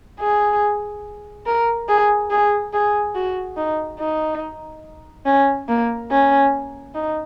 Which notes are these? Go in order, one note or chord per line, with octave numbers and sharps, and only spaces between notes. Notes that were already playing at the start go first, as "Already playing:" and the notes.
G#4
A#4
G#4
G#4
G#4
F#4
D#4
D#4
C#4
A#3
C#4
D#4